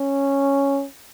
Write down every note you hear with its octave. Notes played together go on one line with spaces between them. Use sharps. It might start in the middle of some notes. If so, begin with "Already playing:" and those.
Already playing: C#4